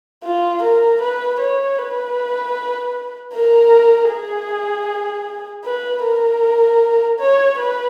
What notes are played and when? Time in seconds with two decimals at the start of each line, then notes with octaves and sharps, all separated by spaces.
0.24 F4
0.63 A#4
1.01 B4
1.40 C#5
1.78 B4
3.34 A#4
4.11 G#4
5.65 B4
6.04 A#4
7.20 C#5
7.58 B4